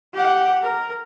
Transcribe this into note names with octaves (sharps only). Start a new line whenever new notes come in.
G4 F#5
A#4